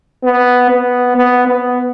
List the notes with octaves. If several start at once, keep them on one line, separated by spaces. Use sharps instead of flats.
B3
B3
B3
B3